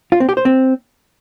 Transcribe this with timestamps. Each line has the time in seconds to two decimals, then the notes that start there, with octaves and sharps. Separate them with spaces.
0.12 F4
0.20 C4
0.29 G4
0.37 C5
0.45 C4